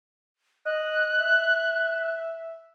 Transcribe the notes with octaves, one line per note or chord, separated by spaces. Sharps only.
D#5 F#6
E5